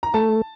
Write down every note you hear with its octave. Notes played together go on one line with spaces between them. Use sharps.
A#5
A3 A5